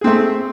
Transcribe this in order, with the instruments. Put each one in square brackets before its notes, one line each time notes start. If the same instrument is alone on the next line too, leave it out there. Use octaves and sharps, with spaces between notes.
[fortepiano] G#4
C4
A3